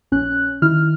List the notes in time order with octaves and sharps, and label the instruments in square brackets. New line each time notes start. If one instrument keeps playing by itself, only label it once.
[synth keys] A#1 C#4 F#6
D#3 E4 F6